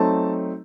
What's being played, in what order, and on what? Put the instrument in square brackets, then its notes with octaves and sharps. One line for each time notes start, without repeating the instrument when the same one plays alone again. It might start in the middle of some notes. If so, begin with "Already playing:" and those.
Already playing: [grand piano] F#3 A3 C4 D#4 A5